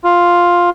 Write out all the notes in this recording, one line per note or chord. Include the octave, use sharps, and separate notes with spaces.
F4